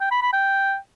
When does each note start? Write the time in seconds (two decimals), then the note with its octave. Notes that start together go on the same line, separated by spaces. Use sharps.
0.01 G5
0.11 B5
0.22 B5
0.33 G5